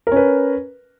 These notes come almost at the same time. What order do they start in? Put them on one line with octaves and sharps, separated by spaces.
A#4 C#4 B4